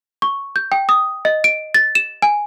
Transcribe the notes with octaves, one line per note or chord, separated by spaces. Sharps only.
C#6
G6
G5
D#6
D#5
D7
A6
E7
G#5